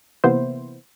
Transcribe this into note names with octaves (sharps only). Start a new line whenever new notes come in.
C3 E3 A#3 B3 E4 C5